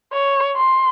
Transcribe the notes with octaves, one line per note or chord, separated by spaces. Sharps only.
C#5
C6